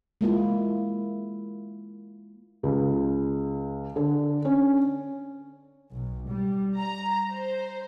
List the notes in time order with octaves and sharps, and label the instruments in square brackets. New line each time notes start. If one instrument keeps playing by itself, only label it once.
[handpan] G#3 A#3 E4 F4
[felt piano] C#2
D3
C#4
[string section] B1
G3
A#5
C5